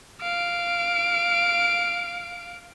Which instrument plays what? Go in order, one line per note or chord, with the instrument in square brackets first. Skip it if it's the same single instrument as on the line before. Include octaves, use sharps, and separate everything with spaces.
[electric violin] F5 D7